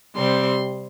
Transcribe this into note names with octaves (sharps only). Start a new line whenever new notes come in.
C3 G3 C4 C6